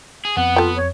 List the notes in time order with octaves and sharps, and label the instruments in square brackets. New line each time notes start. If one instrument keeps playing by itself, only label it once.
[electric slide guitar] G#4
[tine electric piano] F2 [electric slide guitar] B3 [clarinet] F#5
[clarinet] F4 [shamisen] A4 G5
[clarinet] C#5